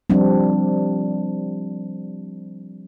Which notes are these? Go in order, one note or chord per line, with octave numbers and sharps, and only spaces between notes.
F3 G3 C4 D4